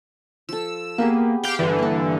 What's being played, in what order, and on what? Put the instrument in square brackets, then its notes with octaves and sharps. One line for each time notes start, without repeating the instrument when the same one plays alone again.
[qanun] F3 A4 [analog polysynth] E6
[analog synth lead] A#3 [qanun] B3 G4 G#4
[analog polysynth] G4 F5 G5 [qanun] B5
[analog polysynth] G2 D3 [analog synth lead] E3 [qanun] E5
[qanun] A#3 A4